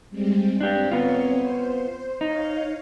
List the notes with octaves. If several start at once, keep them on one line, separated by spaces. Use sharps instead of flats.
G3 G#3 C4
C4 D4 G4
B3 C4 F4 C#5
C5
D#4 C#5 F5